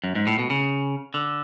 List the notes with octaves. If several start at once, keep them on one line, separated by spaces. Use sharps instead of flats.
F#2
G#2
A2
B2
C#3
D3